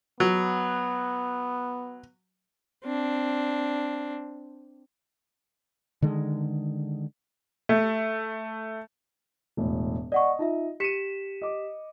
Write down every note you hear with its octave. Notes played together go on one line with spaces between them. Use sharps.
F#3 B3
C4 D4
D3 D#3 G#3
A3
E1 A2
D5 D#5 F#5 C#6
D#4 F4 E5
G4 B6 C#7 D#7 E7
D#5 D6